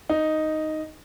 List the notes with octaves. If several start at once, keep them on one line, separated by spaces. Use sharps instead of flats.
D#4